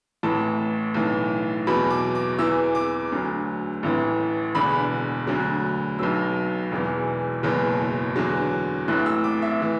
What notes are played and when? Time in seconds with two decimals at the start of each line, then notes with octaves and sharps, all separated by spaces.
0.23 A1 A2 E3 A5
0.94 B1 A2 E3
1.67 E2 B2 F#3 B5
1.91 D6
2.15 D6
2.39 E2 E3 E6
2.75 D6
3.12 D2 D3 F#3
3.83 A1 A2 E3
4.55 E1 E2 D3 B5
5.27 D2 D3 F#3
5.99 B1 B2 F#3 E6
6.71 E1 E2 E3
7.43 F#1 E2 B2 F#3
8.16 E2 D3 F#3
8.88 A1 A2 E3 F#6
9.06 E6
9.24 D6
9.42 E5
9.62 E3